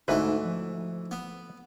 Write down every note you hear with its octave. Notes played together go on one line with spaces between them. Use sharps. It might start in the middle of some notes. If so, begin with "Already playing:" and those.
D2 G#2 E3 A3 D#4 B4
F3
B3